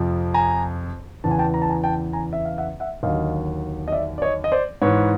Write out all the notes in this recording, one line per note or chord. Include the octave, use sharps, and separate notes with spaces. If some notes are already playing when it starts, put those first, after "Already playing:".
Already playing: F2 C3 F3
G#5 A#5
E2 C#3 E3 A5
G#5
G5 A5
A#5
A5
G#5 A#5
G5 A5
G#5 A#5
E5
F5
E5 F#5
E5 F#5
D#2 D3 F#3 D#5 F5
D#5
D5 E5
D5
C#5 D#5
D#5
C5 D5
G#2 E3 B4 C#5